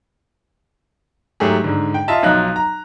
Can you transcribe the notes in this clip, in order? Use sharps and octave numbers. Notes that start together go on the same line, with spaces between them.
G#2 F#3 A3 G4 G#4
G#2 D3
G5
F4 D#5 E5 A5
B1 F3 F#3 D#4 F#6
A#5